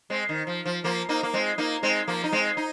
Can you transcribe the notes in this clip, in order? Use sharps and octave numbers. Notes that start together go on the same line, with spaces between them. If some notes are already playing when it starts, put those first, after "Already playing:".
G#3 C4
D#3
F3
F3
F3 A#3
A#3 D#4
A#3
G#3 C4
A#3 D#4
G#3 C4
F3 A#3
D#4
G#3 C4
D#4